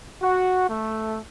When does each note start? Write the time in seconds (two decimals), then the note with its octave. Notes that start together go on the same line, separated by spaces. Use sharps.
0.20 F#4
0.67 A3